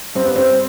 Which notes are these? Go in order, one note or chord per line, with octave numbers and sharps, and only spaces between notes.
G2 C4
B3
C4